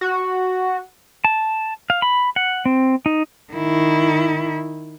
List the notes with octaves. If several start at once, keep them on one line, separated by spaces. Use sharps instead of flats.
F#4
A5
F5
B5
F#5
C4
D#4
D#3 E4